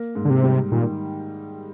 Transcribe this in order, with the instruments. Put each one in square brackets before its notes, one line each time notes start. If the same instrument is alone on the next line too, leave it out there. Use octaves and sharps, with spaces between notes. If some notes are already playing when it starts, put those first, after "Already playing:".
Already playing: [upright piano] A#3
G#2
[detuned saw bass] D3
C3
[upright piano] G3
[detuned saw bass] A#2 [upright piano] D#3